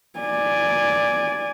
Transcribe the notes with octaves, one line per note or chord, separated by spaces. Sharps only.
D5 G#5